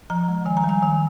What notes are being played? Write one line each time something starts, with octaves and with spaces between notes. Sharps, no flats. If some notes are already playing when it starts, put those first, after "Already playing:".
F3 A#5
G#3
D#3 G#5
A#5
G3
G#5
D#3 G#5